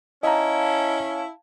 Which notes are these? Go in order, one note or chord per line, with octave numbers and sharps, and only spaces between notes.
C#4 E4 D#5 F5 A5 A#5